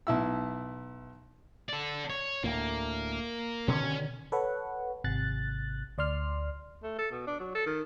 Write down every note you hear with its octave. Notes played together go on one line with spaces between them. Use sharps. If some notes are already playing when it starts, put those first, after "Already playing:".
B1 E4 E6
A4 D5
C#5
D2 A2 A#3
B2 D3 D#3 C#4
A4 B4 C#5 F#5
G#1 C3 F#6 A6
D2 D5 C6 F6
A3
A4
B2
D4
F#3
A4
D#3